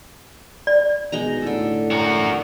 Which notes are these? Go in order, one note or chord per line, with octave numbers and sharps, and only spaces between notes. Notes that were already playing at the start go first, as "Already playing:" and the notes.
D5
B2 G#3 D#4 A#5
A2 D3 A4
F#4 A#4